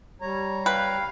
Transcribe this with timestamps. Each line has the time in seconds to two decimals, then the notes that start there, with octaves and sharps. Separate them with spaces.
0.21 G3 C#5 A#5
0.66 B4 F5 G5